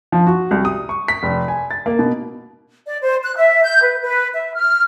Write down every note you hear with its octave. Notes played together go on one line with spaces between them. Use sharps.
F3
F#4
C2
D#6
C#6
B6
F1
G#5
A6
A#3
B2
D5
C5
F#6
E5
G6
B4
B4
E5
F6